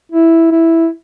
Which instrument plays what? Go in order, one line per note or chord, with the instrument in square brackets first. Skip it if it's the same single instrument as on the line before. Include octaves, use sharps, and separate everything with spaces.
[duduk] E4
E4